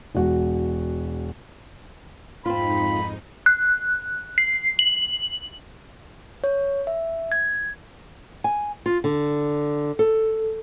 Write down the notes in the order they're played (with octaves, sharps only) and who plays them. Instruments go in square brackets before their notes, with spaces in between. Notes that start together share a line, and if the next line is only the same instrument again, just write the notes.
[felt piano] E1 F#4
[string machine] F2 G#2 D#4 [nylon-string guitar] C4 F4 [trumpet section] B5
[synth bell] F#6
C7
F#7
[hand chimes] C#5
E5
G#6
[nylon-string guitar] G#5
F4
D3
A4